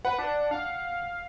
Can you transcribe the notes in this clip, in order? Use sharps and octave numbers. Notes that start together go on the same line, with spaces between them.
B4 F#5
D4
F5